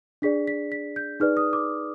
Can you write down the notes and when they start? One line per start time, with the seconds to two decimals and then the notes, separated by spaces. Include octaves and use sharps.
0.22 D4 G#4 D5 B6
0.47 B6
0.72 B6
0.96 G6
1.20 D#4 G#4 B4 D5 F6
1.37 D#6
1.53 D6